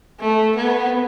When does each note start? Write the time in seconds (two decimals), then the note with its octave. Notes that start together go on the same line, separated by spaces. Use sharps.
0.20 A3
0.55 B3